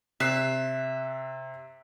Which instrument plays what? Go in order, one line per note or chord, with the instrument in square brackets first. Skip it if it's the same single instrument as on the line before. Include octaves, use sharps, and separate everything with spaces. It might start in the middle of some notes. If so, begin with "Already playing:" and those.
[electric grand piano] C3 F#6 C7 [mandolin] E5